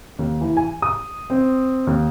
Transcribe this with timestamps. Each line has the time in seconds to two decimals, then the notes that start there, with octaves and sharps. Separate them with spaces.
0.19 D#2
0.41 E3
0.57 G#5
0.82 D#6
1.30 C4
1.87 D#2